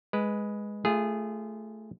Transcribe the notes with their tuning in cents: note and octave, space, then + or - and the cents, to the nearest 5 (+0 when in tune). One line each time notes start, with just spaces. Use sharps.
G#3 +0 B4 +0
A3 +0 F4 -25 G#4 -15